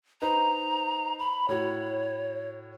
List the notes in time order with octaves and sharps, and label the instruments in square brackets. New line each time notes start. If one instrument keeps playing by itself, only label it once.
[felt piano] D#4 B4 C5 [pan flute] A#5
[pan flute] B5
[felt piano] A2 F#4 [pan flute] C#5